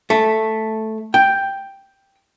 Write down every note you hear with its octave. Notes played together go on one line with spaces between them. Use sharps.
A3
G5